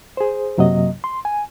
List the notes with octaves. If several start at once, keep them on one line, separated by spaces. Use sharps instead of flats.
G#4 C5
F#2 C3 F#3 A#3 D#5
C6
G#5